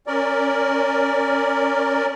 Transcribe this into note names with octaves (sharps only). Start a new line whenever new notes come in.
C#4 A#4 D5